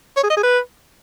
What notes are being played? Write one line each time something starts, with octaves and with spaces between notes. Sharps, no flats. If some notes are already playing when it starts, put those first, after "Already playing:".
C#5
G#4
D#5
G#4
B4